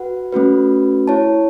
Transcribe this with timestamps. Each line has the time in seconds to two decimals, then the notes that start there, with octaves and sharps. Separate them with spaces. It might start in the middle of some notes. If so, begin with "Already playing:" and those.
Already playing: F#4 B4 F#5
0.32 A3 C#4 F#4 B4
1.08 E4 C#5 A5